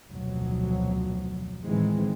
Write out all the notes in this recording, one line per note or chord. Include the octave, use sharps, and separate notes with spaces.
F1 D2 B2 F3 F#3
A2 D#3 E3 G#3 C4